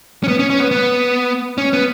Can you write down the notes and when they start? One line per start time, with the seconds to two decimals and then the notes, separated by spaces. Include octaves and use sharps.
0.24 C#4
0.28 B3
0.39 C#4
0.50 C#4
0.60 B3
0.71 B3
1.58 C#4
1.73 B3